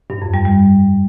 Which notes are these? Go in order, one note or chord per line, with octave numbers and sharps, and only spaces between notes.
G2
F2
G3
G3